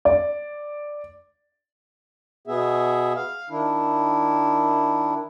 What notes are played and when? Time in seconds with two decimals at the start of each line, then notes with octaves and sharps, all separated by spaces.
0.05 D5
2.47 B2 B3 G#4 E5
3.16 F5
3.50 D#3 D4 E4